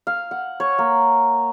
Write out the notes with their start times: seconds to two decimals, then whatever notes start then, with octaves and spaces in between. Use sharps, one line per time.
0.07 F5
0.31 F#5
0.60 C#5
0.79 A#3